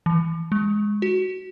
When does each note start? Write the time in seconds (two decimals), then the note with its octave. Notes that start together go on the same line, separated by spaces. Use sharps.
0.06 E3
0.52 G#3
1.02 F#4